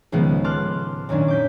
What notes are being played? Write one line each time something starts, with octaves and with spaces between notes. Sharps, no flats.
C#2 A2 D#3 F3 G#3 B3
A5 C6 D6 F6 F#6
F#2 A#2 D#3 C#4 D4
D6 G6 B6